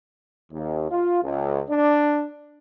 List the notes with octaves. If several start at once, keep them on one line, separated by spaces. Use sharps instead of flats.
D#2
F4
C#2
D4